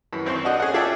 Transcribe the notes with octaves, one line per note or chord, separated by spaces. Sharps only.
F#2 E3
G#1 C4 C5 C6 C#6
D4 F#4 D#5
C#4 G#4 D#5 F#5
F4 G#4 A4 D5 E5 G5